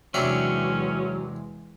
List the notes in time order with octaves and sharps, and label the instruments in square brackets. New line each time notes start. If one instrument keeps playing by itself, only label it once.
[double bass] E2 G#3 [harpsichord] C3 D4 E5 [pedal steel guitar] F#3 [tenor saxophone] C#4